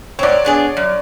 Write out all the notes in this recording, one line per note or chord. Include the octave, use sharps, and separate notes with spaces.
G#2 C4 C#5 D5
B3 D4 G#4
F#2